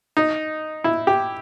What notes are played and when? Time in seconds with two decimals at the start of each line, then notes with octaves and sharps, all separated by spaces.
0.17 D#4
0.84 E4
1.07 G4